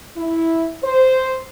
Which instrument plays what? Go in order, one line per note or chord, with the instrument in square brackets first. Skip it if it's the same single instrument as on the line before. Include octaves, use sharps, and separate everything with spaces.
[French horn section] E4
C5